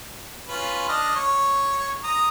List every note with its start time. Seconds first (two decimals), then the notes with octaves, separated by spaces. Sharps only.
0.48 C#4 F4 B4
0.89 D4 D#5 F6
1.16 C#5
2.04 A#5 D#6